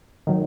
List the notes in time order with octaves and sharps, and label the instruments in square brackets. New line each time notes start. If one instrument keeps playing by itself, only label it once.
[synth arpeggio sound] D#3 F#3